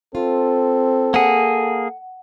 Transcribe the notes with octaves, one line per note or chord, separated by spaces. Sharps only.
C4 F4 A4
A#3 G#4 F#5